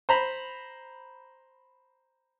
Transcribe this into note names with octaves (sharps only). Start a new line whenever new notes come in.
C5 A#5 B5